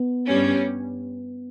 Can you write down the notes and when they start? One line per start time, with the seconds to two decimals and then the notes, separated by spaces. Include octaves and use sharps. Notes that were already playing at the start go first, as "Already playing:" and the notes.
Already playing: B3
0.27 G2 G3 C#4